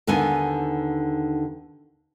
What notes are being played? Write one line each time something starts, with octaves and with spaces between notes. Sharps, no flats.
D#2 D3 B3 D#4 G#5